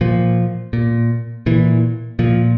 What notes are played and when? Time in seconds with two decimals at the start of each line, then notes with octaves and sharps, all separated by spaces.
0.01 A#2 F3
0.73 A#2
1.46 A#2 E3
2.19 A#2 F3